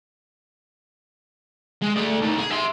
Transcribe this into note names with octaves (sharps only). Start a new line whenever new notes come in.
G#3
A3 D5
A2 D#3
G#4
E5 C6